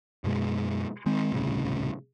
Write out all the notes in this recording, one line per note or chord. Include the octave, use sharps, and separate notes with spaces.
F#2 B2 G#3
D#3 G#3 C4
D#1 C2 A2 C#3